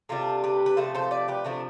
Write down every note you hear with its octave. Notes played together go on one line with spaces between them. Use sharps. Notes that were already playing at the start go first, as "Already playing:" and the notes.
C3 G3 D4 F4 A4
G4 B4
B4
C3 F3 A3 A4 C5
A4 C5
B4 D5
G4 B4
C3 F3 A3 D4